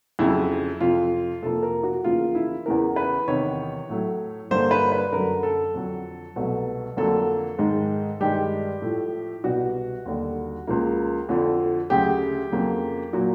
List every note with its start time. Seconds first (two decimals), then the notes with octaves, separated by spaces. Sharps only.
0.19 F2 C#3 F#3 E4
0.81 F2 C3 F3 F4
1.43 F2 C3 F3 A#3 A4
1.63 A#4
1.83 F#4
2.04 E2 C#3 F3 A#3 F4
2.35 E4
2.66 E2 C#3 E3 A#4
2.96 B4
3.28 E2 C3 D#3 C#5
3.89 A2 F#3 A3
4.51 G2 D3 G3 A#3 C5
4.71 B4
4.92 B4
5.12 F#2 D3 F#3 A3 A#4
5.43 A4
5.74 F2 D3 F#3
6.36 C2 B2 F#3 A3
6.97 F2 D3 F#3 A#3 A4
7.58 G#2 D#3 G#3
8.20 G2 D#3 G#3 G4
8.82 A2 F3 A3
9.44 C2 B2 G3 F#4
10.06 D#2 D3 G3
10.67 C#2 C#3 F3 A#3
11.29 F2 D3 F3
11.90 D2 C#3 F#3 G4
12.52 F2 C#3 F#3 A#3
13.13 A#2 F#3 A#3 F#4